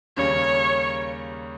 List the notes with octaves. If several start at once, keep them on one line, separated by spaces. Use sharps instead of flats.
D#2 C#3 G3 A#3 C#4 C#5